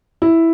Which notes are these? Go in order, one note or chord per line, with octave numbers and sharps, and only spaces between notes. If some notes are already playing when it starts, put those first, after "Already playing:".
E4